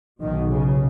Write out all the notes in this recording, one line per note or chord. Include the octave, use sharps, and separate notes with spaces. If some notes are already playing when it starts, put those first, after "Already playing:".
B1 B2 D#3
C#3